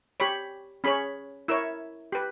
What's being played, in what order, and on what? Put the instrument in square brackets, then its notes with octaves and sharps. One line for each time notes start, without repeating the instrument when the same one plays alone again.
[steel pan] G4 C#5 B5
C#4 G#4 C#5 B5
E4 A#4 C#5 E6
G4 B4